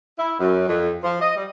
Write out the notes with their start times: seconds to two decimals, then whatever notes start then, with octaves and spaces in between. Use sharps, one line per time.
0.19 E4
0.40 F#2
0.69 F2
1.04 F3
1.22 D#5
1.36 G3